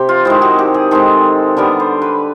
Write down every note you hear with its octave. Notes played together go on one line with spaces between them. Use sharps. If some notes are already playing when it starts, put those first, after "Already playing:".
Already playing: C3 G4
F4
D#3 G#3 C4 E4
F#4
G4
G#4
D#3 G#3 C4 A4
D3 G3 B3 A#4
C5
B4